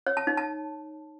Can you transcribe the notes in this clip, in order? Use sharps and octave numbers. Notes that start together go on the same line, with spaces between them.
C#5
A5
D#4
A5